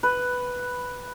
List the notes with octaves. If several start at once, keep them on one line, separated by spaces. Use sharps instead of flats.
B4